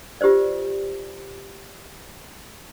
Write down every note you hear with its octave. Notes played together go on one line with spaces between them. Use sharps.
F4 G4 B4 C5 D5